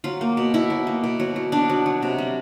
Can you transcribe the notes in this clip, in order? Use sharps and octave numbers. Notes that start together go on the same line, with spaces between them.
F#3 F4
A#3
B2
B2 E4
F#3
A#3
B2
F#3
F#3
B2 D4
F#3
F#3
C3
G3